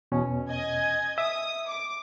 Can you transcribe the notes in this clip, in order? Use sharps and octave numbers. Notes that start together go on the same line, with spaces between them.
E2 B2 C#4
D#5 G#5 G#6
E5 D#6
D6